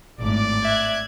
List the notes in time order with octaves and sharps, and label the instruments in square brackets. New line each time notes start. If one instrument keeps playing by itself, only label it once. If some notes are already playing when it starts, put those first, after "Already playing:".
[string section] G#1 A2 D6 [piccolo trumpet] D5
[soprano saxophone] E5 [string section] F#6 G#6